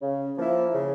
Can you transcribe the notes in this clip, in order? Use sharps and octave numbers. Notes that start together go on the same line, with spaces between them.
C#3
F3 A#3 E4
C#3